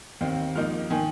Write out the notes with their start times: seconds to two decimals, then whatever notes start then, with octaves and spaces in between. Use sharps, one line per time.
0.21 D#2 D#3 C4
0.55 G#2 F3 A#3 D#4 F6
0.90 D#3 A#3 D#4 G#5